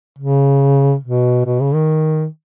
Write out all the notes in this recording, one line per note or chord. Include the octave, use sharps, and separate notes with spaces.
C#3
B2
B2
C#3
D#3